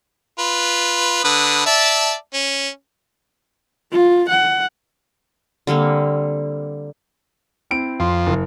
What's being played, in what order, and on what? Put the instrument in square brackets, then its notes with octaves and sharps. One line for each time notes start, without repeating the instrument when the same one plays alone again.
[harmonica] F4 B4
D3 B4 D#6
D5 E5 A5
C#4
[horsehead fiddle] F4
F#5
[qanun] D3 G3 A#3 C4
[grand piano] C4 E4 D7
[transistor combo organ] F2 [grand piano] C6
[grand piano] F#1